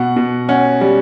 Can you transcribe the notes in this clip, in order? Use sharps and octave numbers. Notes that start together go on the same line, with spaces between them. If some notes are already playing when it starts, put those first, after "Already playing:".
Already playing: B2 F#5
B2
C#4 F#5
G3